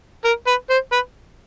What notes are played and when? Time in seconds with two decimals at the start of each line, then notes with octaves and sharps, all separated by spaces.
0.25 A#4
0.47 B4
0.70 C5
0.92 B4